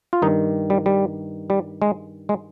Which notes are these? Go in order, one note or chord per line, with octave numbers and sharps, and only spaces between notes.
F4
G2 D#3 D#4
G3
G3
G3
G#3
G#3